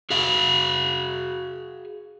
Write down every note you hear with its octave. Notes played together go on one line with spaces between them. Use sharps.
F#4 G#4 F5